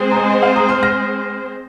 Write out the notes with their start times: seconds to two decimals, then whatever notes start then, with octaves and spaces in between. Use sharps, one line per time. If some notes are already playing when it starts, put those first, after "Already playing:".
Already playing: G#3 C4 G#4 C5
0.11 A#5
0.16 D#5 G#5
0.30 D#5
0.43 F5
0.56 A#5 D#6
0.69 C6 F6
0.83 F6 A#6